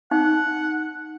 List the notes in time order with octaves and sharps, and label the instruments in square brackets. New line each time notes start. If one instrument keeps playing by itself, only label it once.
[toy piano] D#4 [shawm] F#5